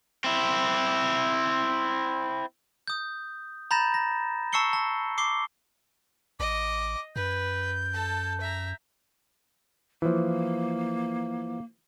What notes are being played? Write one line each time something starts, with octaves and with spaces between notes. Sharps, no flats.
C4 E4
D#6 G6
A#5 B5 G6 A6 A#6 E7
A#6
A5 C#6 E6 C7 C#7 G7
A5
D6 C7 G7
A1 D#5 D6
F#2 B4 G6
A4 A5
E5 A#5
E3 F3 A#3